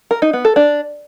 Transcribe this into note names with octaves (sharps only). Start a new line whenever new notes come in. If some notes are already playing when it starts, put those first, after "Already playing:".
A#4
D#4
B3
A4
D4